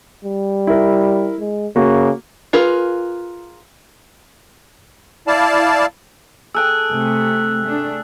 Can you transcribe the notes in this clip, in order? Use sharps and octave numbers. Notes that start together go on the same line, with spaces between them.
G3
E4 A#4
G#3
C#3 A#3 F#4
F4 G#4 A#4 B4
E4 D5 F5 A5
G#4 A4 G5 E6 F#6
C3 A3
A3 D4